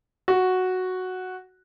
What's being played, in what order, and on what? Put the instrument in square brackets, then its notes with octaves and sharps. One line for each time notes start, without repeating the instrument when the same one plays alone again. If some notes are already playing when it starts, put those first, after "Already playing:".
[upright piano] F#4